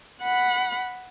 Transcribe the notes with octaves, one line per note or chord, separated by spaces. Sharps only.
F#5 B5